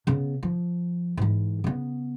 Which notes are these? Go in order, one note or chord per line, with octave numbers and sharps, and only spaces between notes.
C#3 B3
F3
G#2 E3
C#3 B3